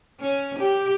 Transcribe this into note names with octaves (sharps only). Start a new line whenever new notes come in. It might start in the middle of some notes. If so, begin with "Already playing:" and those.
C#4
G4